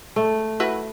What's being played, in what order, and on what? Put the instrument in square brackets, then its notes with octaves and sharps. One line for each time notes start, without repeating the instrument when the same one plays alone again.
[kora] A3
[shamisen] E4 F#4 B4